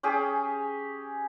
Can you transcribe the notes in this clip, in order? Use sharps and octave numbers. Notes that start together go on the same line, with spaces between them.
C#4 G4 G#4